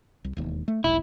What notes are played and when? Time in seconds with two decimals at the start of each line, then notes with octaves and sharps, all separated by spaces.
0.24 C2
0.37 E1 D#2
0.68 A3
0.84 E1 B1 E4